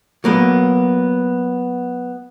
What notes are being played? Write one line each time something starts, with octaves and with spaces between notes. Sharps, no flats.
F#3 A#3 B3